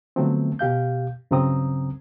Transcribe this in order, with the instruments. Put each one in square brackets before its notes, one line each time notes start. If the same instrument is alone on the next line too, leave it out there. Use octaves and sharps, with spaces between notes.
[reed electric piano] D3 F3 F#3 A3 B3 C4
B2 G4 F5 G6
G2 C#3 F#3 C4 A#5 D#6